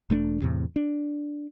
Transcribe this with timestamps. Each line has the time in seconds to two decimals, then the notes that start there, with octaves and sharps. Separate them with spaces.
0.10 E1 A3 B3 D4
0.42 E2 A2 C3
0.76 D4